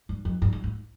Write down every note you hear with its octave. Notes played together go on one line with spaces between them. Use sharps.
G2
F2
G2
G2
G#2